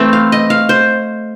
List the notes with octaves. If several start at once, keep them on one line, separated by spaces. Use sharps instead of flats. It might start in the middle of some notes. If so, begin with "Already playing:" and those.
Already playing: E3 A3 C4
F5
D#5
F5
C5